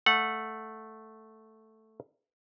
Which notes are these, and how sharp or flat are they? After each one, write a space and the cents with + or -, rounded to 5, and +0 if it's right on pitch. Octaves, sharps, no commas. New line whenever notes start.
A3 +0 F#5 -15